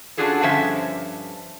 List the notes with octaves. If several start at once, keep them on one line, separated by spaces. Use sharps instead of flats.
C#4 D4 F4 F#4 G#4 A4
G2 D3 F3 C#4 C5 E5